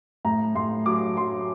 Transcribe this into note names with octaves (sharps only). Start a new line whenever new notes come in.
A2 A#5
A2 C6
F#3 D6
F#3 C6